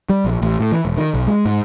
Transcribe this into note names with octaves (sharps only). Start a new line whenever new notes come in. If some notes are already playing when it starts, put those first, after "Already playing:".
G3
A#1
A1
A2
E3
E1
D#3
B1
G#3
G#2